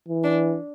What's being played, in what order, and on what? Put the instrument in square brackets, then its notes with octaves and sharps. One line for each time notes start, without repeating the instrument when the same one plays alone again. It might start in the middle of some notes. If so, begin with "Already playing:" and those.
[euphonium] E3
[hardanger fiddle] D4